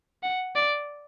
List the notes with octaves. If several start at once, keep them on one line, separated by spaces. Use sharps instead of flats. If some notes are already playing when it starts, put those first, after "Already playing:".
F#5
D5